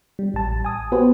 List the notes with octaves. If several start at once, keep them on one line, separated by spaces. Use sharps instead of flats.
G3
A1 A5
G#5 D#6
B3 F#4 G4 B4 C5